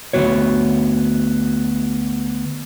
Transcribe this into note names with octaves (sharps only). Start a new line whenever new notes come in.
D2 C3 B3 F#4 C#5